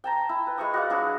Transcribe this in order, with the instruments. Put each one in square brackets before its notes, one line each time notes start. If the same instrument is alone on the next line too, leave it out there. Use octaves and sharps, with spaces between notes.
[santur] G5 A5 A#5
E4
B4
G#3 E4 C#6 D#6
F#4 D5 F5
F#3 D4 E4 G#4